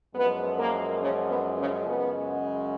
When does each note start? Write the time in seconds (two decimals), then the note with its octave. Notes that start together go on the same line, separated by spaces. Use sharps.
0.15 F#2 F3 G#3 B3 B4
0.58 A#3 A#4
1.00 C#3 C#4
1.28 B3
1.57 C#3 C#4
1.85 F#2 C#3 G#3 B3